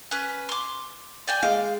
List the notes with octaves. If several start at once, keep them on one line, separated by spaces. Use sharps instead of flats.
C#4 B4
C6 D6
D5 G5 G#5
G#3 F5 D6